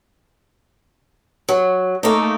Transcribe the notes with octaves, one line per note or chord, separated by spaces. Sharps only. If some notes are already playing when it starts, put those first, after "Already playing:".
F#3
A3 A#3 D#4